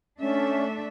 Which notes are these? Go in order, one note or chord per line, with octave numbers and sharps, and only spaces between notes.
A3 C#4 D4 E5